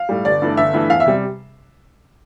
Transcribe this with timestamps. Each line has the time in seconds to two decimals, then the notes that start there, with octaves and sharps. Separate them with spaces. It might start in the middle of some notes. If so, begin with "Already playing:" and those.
Already playing: F5
0.09 A2 G3
0.25 G1 D5
0.42 G2 E3 A3
0.57 G1 E5
0.74 G2 E3 A3
0.89 E2 F5
1.00 E5
1.06 C3 G3